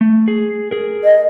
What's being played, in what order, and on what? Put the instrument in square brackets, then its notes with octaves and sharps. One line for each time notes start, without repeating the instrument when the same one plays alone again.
[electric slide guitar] A3
G#4
G#4 A#4
[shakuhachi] D#5